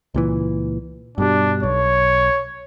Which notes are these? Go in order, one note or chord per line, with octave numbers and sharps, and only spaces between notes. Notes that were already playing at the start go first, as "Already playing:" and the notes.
C#2 A#2 E3
G2 B2 G3 D4
B1 C#5